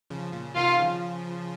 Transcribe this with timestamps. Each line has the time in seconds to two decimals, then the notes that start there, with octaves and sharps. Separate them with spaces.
0.10 C#3 F3
0.33 A#2 C#3
0.56 C3 D#3 F4 F5
0.69 D#3
0.79 C#3 F3